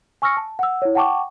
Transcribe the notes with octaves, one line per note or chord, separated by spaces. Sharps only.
G#5 C#6 E6 F6 A#6 C#7
A5
F#5 E6
E4 C#5
F#5 G5 A5 C#6 D6